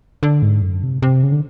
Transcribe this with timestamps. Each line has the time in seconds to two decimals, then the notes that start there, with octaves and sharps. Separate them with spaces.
0.23 D3
0.42 G#2
0.62 F#2
0.83 C3
1.02 C3
1.23 C#3
1.32 D3